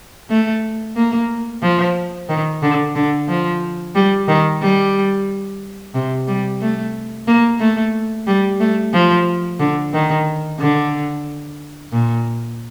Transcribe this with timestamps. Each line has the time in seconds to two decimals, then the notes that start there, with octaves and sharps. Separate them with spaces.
0.30 A3
0.96 A#3
1.62 F3
2.29 D#3
2.62 D3
2.95 D3
3.28 F3
3.95 G3
4.28 D#3
4.62 G3
5.95 C3
6.27 G3
6.61 A3
7.27 A#3
7.60 A3
8.27 G3
8.60 A3
8.93 F3
9.60 D3
9.93 D#3
10.59 D3
11.92 A#2